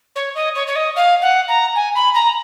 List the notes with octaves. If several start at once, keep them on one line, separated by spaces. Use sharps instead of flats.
C#5
D#5
C#5
C#5
D#5
F5
F#5
A#5
G#5
B5
A#5